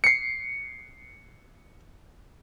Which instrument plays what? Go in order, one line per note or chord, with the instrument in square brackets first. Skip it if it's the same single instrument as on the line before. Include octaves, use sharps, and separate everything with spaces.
[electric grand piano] C7 C#7